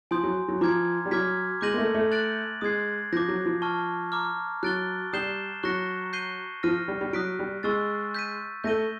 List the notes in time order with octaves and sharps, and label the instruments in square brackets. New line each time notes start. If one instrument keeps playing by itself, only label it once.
[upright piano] F3 [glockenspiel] G#5 C6 D#6 G6
[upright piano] F#3
F#3
[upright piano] F3 [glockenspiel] A#5 D6 F6 G#6
[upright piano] G3
[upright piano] F#3 [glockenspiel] D6 F6 G#6 B6
[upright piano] G#3 [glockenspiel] D6 G6 A#6 D#7 F#7
[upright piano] A#3
A3
A3
[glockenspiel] F#6 A6 D7 F#7
[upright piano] G#3 [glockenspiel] D#6 G#6 C7
[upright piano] F3 [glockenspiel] D6 G6 A#6
[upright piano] F#3
F3
[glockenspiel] A5 C#6 F6
A#5 D6 F6
[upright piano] F#3 [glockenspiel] F#6 A6 D7 G7
[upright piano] G3 [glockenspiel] D#6 G6 C7 E7 G7
[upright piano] F#3 [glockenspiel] C#6 F#6 A#6 C#7
[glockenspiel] G6 C7 D#7 G7
[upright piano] F3 [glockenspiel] F6 A#6 D#7
[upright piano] G3
G3
[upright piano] F#3 [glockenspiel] D#6 F#6 B6 D7
[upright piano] G3
[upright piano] G#3 [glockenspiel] C#6 E6 A6
[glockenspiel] G6 B6 D#7
[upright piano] A3 [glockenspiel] G6 A#6 D#7 G7